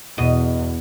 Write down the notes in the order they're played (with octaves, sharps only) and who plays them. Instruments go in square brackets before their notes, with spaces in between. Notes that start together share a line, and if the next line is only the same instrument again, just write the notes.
[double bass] E2 [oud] B2 D#5